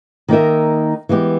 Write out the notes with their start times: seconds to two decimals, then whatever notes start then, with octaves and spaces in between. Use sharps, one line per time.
0.28 D#3 A#3 D#4 A#4 E5
1.09 E3 G#3 B3 G4